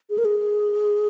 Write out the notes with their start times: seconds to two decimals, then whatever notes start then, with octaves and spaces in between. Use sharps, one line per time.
0.10 G#4
0.18 A#4
0.25 G#4